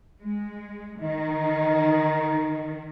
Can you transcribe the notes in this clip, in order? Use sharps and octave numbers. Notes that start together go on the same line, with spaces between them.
G#3
D#3 D#4